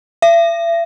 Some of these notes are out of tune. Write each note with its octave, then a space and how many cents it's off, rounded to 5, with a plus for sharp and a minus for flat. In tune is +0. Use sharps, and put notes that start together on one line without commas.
E5 +40